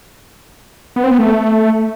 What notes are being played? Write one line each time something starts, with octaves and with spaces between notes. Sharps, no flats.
B3
C4
B3
A3